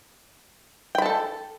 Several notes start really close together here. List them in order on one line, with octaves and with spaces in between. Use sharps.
G5 B5 A5 A4